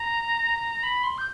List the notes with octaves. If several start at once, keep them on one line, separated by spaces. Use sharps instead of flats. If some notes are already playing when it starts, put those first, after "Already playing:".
Already playing: A#5
B5
C6
G6